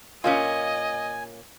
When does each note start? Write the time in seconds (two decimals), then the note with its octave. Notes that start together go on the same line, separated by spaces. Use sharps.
0.24 A#2 A#3 C#4 F4 D#5 G#5